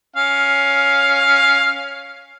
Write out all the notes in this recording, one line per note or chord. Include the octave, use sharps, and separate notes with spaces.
C#4 F5